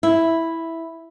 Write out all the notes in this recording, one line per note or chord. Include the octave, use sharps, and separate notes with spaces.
E4